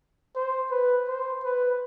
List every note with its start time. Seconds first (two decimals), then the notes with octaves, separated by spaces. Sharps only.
0.36 C5
0.71 B4
1.08 C5
1.44 B4